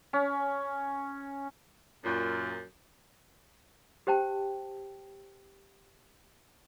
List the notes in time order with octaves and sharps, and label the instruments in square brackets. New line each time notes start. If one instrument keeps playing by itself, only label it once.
[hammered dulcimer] C#4
[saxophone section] F#2 A#2
[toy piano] G4 C5 G5 A5